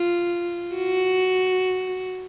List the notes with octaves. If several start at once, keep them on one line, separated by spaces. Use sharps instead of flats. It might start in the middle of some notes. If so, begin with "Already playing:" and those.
Already playing: F4
F#4